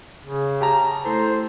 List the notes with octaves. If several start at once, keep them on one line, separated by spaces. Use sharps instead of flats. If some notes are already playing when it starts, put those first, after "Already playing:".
C#3
G4 A5 A#5
A3 E4 A4 C5